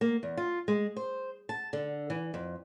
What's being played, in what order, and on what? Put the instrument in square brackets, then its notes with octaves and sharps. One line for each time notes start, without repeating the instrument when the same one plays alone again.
[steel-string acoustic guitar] A#3
E2
F4
G#3
C5
A5
D3
E3
F2